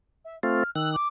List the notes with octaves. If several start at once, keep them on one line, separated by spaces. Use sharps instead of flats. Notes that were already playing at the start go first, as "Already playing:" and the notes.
E5
A3 C4 F4 F6
D#3 E6 F#6
D6